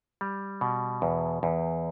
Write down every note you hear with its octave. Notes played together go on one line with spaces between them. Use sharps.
G3
B2
E2
E2